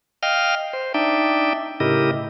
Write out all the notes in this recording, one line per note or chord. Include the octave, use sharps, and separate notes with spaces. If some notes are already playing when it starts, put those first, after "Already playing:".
D#5 F5 G5 F6
C5
D4 D#4 D5 E5 G5
A2 C#3 E4 G4 A#4 D#5